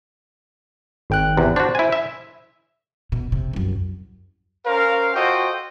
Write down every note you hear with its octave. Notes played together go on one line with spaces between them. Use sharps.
G#1 G5 F#6
E2 C3
D4 F#4 C5
E4 G#5
E5
B2
C3
C2 F#2
C#4 A#4 C5 F5
F4 F#4 A4 C5 D#5 G5